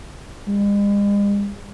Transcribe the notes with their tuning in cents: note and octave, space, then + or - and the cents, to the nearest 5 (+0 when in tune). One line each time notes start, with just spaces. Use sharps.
G#3 -45